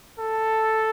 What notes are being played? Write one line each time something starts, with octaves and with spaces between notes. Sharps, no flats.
A4